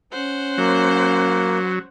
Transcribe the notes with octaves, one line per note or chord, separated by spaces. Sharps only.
C#4 C5 F#5
F#3 A#3